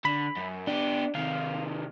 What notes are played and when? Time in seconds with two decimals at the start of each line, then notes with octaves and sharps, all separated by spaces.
0.05 D3 B5
0.37 F#2
0.67 B3 D4 G4
1.15 C3 D#3 F5